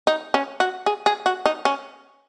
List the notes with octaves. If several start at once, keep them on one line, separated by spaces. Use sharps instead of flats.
D#4
C#4
F#4
G#4
G#4
F#4
D#4
C#4